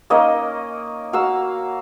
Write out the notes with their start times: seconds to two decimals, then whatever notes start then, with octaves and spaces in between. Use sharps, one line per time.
0.10 A#3 C#4 D#4 D#5
1.13 F#4 F5 A#5 E6